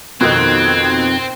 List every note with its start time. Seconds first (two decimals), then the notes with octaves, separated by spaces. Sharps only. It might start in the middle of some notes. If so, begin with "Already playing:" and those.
0.21 F2 B2 D#3 C4 G#6